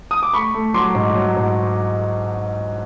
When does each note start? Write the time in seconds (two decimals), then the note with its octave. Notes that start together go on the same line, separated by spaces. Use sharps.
0.11 D#6
0.23 D6
0.33 A3 B5 C#6
0.54 A3
0.74 F#3 C6 D6
0.95 G#2
1.15 F#3
1.36 G#2